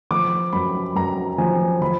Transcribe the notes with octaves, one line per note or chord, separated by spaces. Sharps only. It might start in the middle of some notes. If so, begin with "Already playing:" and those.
F3 D6
F#2 B5
F#2 A#5
F3 G#5
F3 B5